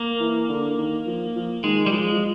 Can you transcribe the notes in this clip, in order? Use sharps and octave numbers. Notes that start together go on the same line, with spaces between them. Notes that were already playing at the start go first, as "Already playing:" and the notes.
Already playing: A#3
E3
D3
D#3
F3
F3
D#3 G#3
G3
F3 G#3
F3